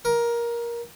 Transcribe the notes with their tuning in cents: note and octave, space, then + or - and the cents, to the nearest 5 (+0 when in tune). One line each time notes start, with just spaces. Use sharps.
A#4 +15